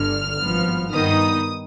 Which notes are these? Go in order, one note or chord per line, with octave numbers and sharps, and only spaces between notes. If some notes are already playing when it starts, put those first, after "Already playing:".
Already playing: G1 G2 D3 F6
G#1 G2 F3 B3
G2 D#3 B3 D#4 D#6